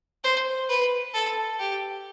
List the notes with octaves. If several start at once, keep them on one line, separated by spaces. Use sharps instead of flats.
C5
B4
A4
G4